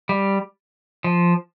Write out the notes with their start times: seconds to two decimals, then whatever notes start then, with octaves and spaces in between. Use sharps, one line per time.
0.09 G3
1.04 F3